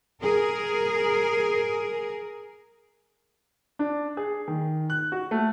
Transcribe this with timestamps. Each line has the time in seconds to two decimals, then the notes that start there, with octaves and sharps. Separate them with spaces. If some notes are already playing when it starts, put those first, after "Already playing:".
0.22 G#4 A#4
3.79 D4
4.17 G#4
4.48 D#3
4.90 F#6
5.12 F#4
5.31 A3